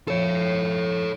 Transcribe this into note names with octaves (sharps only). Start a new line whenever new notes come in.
F2 A4 C#5